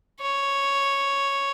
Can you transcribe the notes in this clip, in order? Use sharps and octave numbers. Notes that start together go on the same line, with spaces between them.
C#5